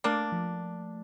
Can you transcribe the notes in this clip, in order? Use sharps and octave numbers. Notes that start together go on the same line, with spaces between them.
A3 A#3 D4
F3